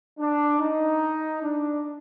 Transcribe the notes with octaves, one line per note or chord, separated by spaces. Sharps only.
D4
D#4
D4